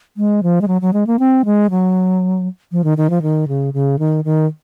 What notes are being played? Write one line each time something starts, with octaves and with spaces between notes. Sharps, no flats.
G#3
F3
G#3
F#3
F#3
G#3
A#3
C4
G#3
F#3
F3
D#3
D#3
F3
D#3
C#3
C#3
D#3
D#3